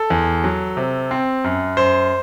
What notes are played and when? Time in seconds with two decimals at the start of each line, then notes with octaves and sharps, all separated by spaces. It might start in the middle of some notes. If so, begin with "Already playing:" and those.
Already playing: A4
0.10 E2
0.44 F#3
0.77 C3
1.11 C4
1.44 F#2
1.77 F#2 C5